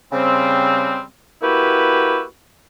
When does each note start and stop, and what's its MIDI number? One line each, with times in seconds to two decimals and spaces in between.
0.13 1.00 49
0.13 1.00 55
0.13 1.00 60
1.42 2.22 58
1.42 2.22 64
1.42 2.22 66
1.42 2.22 67
1.42 2.22 71